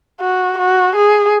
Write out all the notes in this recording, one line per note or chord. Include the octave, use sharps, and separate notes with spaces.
F#4
F#4
G#4